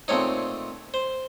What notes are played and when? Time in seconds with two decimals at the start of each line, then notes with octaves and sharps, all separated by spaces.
0.08 A#2 A3 C4 D#4 C#5
0.94 C5